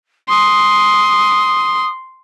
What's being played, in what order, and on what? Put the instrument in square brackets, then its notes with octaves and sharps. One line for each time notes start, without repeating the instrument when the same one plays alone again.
[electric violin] C6 [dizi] D#6